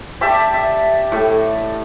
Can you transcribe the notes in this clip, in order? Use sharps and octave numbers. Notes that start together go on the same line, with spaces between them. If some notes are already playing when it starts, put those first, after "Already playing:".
G4 D5 E5 A5
E5
A2